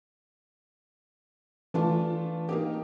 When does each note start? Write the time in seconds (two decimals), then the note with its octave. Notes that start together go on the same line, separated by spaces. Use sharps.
1.74 E3 A3 D4 F4
2.49 A#3 D#4 G4